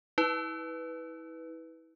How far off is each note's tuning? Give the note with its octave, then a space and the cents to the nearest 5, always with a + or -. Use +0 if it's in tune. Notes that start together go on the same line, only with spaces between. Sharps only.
E4 -30 B4 +0